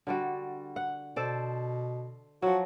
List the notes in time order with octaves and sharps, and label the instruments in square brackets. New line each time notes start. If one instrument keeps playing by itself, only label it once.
[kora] D3 G3 F#4
F#5
[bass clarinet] B2 [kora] A4 C5 D5
[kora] F3 F#3 [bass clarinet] F#4